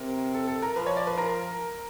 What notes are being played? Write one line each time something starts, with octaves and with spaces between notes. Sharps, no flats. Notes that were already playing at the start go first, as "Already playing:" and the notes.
Already playing: C3 A#4
A4
A4
A#4
F3 B4
C#5
D5
B4
A#4